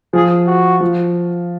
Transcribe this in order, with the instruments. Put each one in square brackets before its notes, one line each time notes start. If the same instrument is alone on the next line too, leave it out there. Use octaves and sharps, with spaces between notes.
[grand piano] F3 [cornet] G#4
[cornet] F#4
[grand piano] F3